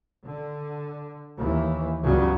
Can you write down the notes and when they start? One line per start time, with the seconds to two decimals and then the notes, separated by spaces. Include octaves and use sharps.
0.25 D3
1.38 D#2 E3
2.02 C#2 G2 C#3 F#3 G3 B3